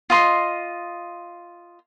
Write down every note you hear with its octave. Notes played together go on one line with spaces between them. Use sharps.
F4 D#5 C6